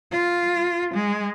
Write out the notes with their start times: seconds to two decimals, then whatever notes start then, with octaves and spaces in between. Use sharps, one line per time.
0.11 F4
0.94 G#3